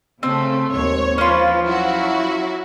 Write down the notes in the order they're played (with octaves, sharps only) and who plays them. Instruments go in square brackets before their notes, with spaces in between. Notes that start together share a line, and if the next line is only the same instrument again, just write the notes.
[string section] C#3 A3 [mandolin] C4
[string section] D#2 G#2 C#5
[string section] F3 B4 [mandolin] C#4 F4
[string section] F#3 E4 F#4